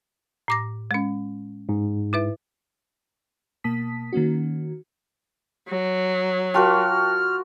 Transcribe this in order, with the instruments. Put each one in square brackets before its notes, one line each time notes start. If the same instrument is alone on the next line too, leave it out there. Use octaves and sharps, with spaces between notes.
[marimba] A2 D6 A#6
G#3 C#4
[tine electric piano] G#2
[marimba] E4 B4 E5
[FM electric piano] B2 A#3 A5 D#6 B6
D#3 A#3 C#4 F#4
[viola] F#3
[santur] F4 F#4 A#4 [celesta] G5 A5 [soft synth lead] F6